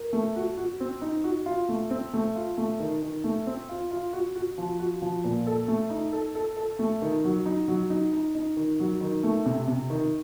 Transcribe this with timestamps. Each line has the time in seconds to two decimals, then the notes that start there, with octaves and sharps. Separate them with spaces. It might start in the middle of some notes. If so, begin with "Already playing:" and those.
Already playing: A#4
0.13 A3
0.36 F#4
0.58 F#4
0.80 C4
1.01 D#4
1.24 F#4
1.46 F4
1.69 A3
1.91 C4
2.13 A3
2.35 F4
2.58 A3
2.80 D#3
3.02 D#3
3.24 A3
3.47 C4
3.69 F4
3.91 F4
4.13 F#4
4.36 F#4
4.58 F3
4.79 F#4
5.02 F3
5.24 A#2
5.47 A4
5.68 A3
5.90 D#4
6.12 A4
6.35 A4
6.56 A4
6.79 A3
7.02 D#3
7.24 F#3
7.46 D#4
7.68 F#3
7.90 D#4
8.12 D#4
8.35 D#4
8.57 D#3
8.80 F#3
9.01 D#3
9.23 A3
9.46 C3
9.68 C3
9.90 D#3